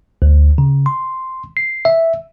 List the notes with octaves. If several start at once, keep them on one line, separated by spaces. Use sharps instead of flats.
D2
C#3
C6
C7
E5